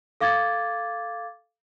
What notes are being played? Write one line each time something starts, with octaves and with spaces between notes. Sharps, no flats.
A4 F5 D6 G#6 A6